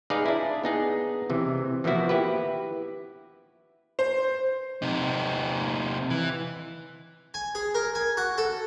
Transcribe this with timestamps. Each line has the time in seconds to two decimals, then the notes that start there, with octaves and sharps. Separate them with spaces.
0.10 D#4 G#4 B4 D5 F5
0.26 D4 E4
0.64 B3 D#4 G#4
1.30 C3 E3
1.84 E3 F3 A#3 B3 E4 F#4
2.09 E4 G4 B4
3.99 C5
4.82 C3 D#4
6.10 E3
7.34 G#5
7.55 G#4
7.75 A#4
7.95 G#5
8.17 F#4
8.38 A4